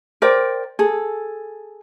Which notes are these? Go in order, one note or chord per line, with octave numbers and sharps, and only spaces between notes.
A#4 C5 D5 G5
G#4 A4